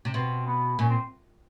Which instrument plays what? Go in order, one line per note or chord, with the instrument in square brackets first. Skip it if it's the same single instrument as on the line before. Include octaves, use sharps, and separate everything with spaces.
[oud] C3
[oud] B2 [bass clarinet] C4
[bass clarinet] B3
[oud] A#2 [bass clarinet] C#4
[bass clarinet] C4